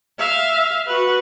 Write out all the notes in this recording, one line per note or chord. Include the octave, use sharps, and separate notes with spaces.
E5 F5
F#4 B4